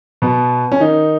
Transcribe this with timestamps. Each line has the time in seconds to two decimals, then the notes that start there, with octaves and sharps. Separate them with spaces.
0.22 B2 B3
0.72 C#4
0.80 D#3 D#4